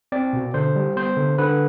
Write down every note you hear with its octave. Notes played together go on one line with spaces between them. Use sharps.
C4 D5
B2
D3 C5
G3
B3 C5
D3
D3 B4